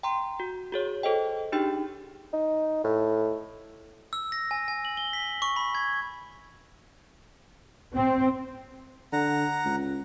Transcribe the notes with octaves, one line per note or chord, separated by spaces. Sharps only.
G5 A#5 C6
F#4
F#4 G#4 C#5
A4 C5 D#5 G5
D4 D#4 G4 G#4 G5
D#4
A2
E6
A#6
G#5
G#5
F#7
G7
B6
C#6
B5
G#6
C4
D3 F#5 A#5
C#2